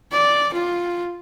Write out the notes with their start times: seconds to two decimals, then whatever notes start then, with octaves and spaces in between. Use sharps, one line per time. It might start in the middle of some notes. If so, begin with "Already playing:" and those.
0.12 D5
0.54 F4